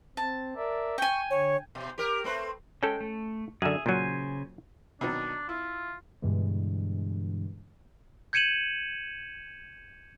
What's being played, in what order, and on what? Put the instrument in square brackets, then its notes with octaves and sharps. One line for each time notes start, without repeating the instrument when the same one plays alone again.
[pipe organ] C4 [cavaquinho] A5
[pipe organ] A#4 D5 E5
[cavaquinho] G5 G#5 [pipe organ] C#6
[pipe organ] D3 [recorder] C#5
[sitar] B2
G4 A#4
A3 C4 B4
[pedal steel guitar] G#3 G5 [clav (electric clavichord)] C#4 A4
[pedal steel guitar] A3
[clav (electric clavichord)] F#2 D3 [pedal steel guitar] G#4 E5
[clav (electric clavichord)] A#2 F#3 [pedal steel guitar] C#3 C5 G#5
[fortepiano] B2 D#3 F#3 [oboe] D4
[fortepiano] E4 [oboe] F4
[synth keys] G2 B2 D3 E3 G#3
[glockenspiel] G6 G#6 C#7 D#7 E7 F#7